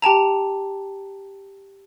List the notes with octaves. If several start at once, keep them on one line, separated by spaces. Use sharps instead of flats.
G4 G5 A5 A#5